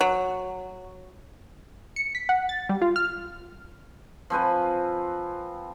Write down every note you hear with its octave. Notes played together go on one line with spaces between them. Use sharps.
F#3
C#7
B6
F#5
A6
G3
F4
F6
F3 C4 B4 G#5